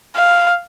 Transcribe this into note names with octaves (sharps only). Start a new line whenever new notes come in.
F5